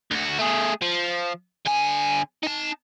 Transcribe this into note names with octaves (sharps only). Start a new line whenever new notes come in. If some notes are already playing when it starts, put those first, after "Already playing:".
D2 F#4
A3 G#4
F3
D3 G#5
D#4 A5